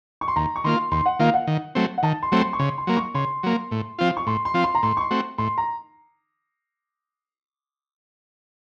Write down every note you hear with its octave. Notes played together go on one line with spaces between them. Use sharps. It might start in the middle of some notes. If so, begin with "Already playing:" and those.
C#6
C6
D#2 A#5
C#6
D#3 A#3 F4 C6
D#2 C6
F#5
D#3 A#3 F4 F5
F#5
D#3
F#3 A3 C4
F#5
D#3 A5
C6
F#3 A3 C4
C6
C#6
C#3 C6
C6
F#3 A#3
C#6
C#3 C6
F#3 A#3
A2
F3 C4 F4
C#6
A2 C6
C6
F3 C4 F4
C6
A#5
A2 C6
C#6
C6
A3 C4 F#4
A2 C6
A#5